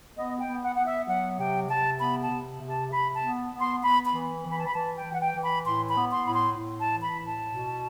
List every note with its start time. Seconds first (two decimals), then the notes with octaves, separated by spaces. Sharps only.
0.17 B3 D#5
0.39 G5
0.47 B3
0.63 F#5
0.75 B3 F#5
0.85 E5
1.07 F#3 F#5
1.38 C3 G5
1.68 C3 A5
1.99 B3 B5
2.22 A5
2.30 C3
2.61 C3
2.69 A5
2.91 C3 B5
3.14 A5
3.22 B3
3.52 B3
3.60 C6
3.82 B3 B5
4.06 B5
4.13 E3
4.44 E3
4.52 B5
4.59 A5
4.66 B5
4.74 E3 A5
4.96 G5
5.04 E3
5.14 F#5
5.20 G5
5.35 E3
5.43 B5
5.65 A2 C6
5.88 B5
5.96 B3
6.11 C6
6.27 A2 B5
6.34 C6
6.57 A2
6.80 A5
6.88 E3
7.03 B5
7.19 A2
7.26 A5
7.49 B2